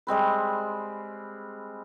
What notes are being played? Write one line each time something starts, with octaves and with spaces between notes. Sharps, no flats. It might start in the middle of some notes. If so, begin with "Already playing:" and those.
G3 G#3 C4 B4